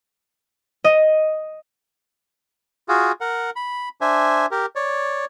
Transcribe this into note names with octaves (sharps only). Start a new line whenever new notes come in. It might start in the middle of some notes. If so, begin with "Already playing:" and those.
D#5
F4 F#4 G#4
A#4 F#5
B5
D4 C5 E5 G#5
G4 A#4
C#5 D5